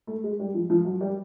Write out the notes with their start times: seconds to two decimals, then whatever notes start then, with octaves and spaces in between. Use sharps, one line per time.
0.07 A3
0.24 G#3
0.39 G3
0.54 F3
0.70 F3
0.85 F#3
1.01 G3